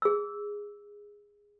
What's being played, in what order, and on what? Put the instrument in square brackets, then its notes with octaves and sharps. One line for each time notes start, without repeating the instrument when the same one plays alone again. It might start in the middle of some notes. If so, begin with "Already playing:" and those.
[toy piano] G#4 E6